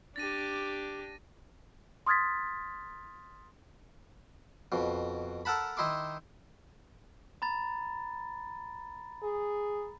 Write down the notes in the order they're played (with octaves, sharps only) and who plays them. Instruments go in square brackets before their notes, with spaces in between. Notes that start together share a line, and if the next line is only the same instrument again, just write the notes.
[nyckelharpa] D4 G4 [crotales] A6 A#6 D#7
[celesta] C6 D#6 F6 G#6 A6 B6
[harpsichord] F2 B2
A4 A#4 F#5 A5 B5
D#3 D#4 E4 C6 D6
[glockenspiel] A#5 B5 A6
[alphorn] G#4